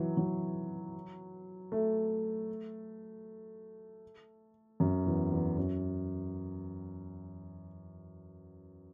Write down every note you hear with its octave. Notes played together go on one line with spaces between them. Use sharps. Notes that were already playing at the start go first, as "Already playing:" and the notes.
Already playing: E3 F#3
F#3
A3
F#2
E2
E2
F#2